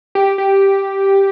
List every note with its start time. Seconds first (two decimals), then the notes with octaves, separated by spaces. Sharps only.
0.15 G4
0.38 G4